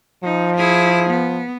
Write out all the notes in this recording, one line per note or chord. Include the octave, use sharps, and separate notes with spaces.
F3 D#4
E4 G#4
B3